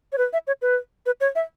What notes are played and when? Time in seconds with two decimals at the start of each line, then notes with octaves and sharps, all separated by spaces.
0.12 C#5
0.18 B4
0.33 E5
0.47 C#5
0.62 B4
1.06 B4
1.21 C#5
1.35 E5